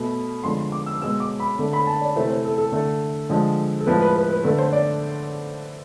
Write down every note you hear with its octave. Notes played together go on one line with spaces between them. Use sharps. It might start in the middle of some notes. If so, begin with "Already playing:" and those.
Already playing: B2 A3 B5
D3 F3 G#3 C6
C6
D6
E6
B2 G#3 E6
D6
B5
D3 A3
B5
A5
D5
C3 E3 A3 C5
C5
A4
A4
D3 A3
D3 F3 G#3
A4
A2 F3 G#3 B4
B4
B4
B4
D3 A3 B4
C5
D5